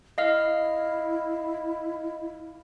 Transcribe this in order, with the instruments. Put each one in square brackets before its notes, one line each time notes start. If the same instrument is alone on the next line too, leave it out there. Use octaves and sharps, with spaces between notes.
[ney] E4 [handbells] D#5 F5 F6